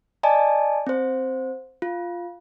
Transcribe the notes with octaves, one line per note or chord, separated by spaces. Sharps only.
D5 D#5 G#5 A5
C4 C5
F4